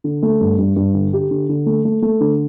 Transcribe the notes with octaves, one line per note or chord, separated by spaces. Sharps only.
D3
A3
G2
G2
G2
D3
G4
D3
D3
A3
A3
A3
D3